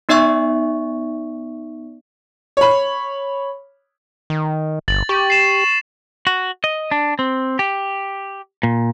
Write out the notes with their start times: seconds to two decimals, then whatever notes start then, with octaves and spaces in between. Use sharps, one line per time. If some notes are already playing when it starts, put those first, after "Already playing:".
0.09 B3 D#4 D5 E5 C#6
2.57 C#5 B5
4.30 D#3
4.88 G1 A6 F#7
5.09 G4 C#6
5.30 C7 E7
6.27 F#4
6.64 D#5
6.91 D4
7.19 C4
7.59 G4
8.63 A#2